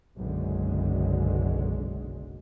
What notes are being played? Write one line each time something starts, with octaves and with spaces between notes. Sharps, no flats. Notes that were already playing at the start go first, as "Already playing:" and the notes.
F#1 B1 F#2 D3 G#3